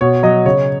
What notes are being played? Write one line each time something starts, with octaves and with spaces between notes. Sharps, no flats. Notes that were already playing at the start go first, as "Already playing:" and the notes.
B2 C#5
F#3 D#5
C#3 C#5